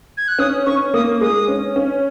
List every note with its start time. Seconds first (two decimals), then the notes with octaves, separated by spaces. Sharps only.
0.17 G#6
0.28 F#6
0.39 C#4 D#6
0.66 C#4 C#6
0.94 A#3 D#6
1.21 G#3 D#6
1.48 C#4
1.76 C#4